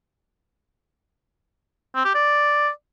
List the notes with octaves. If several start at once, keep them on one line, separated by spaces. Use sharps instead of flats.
C4
G4
D5